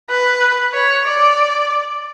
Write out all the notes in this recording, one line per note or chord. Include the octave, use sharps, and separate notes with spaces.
B4
C#5
D5